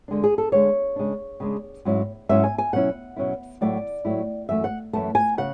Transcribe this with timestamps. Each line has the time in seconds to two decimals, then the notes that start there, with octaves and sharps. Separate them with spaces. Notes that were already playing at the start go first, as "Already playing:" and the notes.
0.08 D3 G#3 D4
0.24 G#4
0.38 A4
0.52 D3 G#3 D4 C#5
0.96 C#3 G#3 D4
1.40 C#3 G#3 D4
1.85 G#2 F#3 C#4 E4
2.29 G#2 F#3 C#4 E4 E5
2.44 G#5
2.58 G#5
2.73 B2 F#3 C#4 E4 F#5
3.16 B2 F#3 C#4 E4
3.61 A2 F#3 A3 E4 D5
4.05 A2 F#3 A3 E4
4.49 F#2 E3 A3 E5
4.64 F#5
4.93 F#2 E3 A3 A5
5.15 G#5
5.38 C#3 F#5